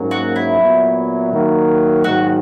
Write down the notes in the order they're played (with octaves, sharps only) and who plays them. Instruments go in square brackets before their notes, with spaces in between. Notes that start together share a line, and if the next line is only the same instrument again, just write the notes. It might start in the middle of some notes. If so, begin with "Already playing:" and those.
Already playing: [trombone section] G#2 F#3 A#3 C#4
[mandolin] F#4
E4
[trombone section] A#2 F#3 B3
D#3 F#3 A#3
[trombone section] G#2 D#3 F#3 A#3 [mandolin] F#4